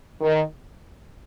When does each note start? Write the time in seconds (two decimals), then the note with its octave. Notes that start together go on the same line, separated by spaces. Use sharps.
0.21 D#3